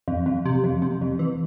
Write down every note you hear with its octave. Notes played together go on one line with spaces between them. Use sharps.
F2
F2
C3
F2
C3
F2
E3